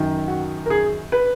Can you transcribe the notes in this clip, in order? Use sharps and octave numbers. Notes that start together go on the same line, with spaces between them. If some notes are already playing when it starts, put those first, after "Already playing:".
Already playing: F#2 D#3
F#4
A#4
G#4
B4